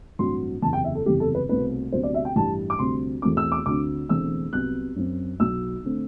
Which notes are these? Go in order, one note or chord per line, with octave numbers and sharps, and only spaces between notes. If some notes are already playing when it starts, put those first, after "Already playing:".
A1 G2 F#3 C4 C6
F#1 E2 C3 A5
G5
E5
A4
F#1 E2 C3 G3 G4
A4
B4
C2 B2 A3 C4 B4
D2 C3 F#3 B3 C5
D5
E5
G5
A1 G2 E3 G3 A5
D6
D2 C3 G3 C4 C6
E2 B2 A3 C4 D6
E6
D6
D2 D3 A3 C4 D6
E1 E2 D3 A3 C4 E6
C2 C3 F#3 B3 F#6
F#2 F#3 C4
B1 B2 F#3 E6
D3 A3 C4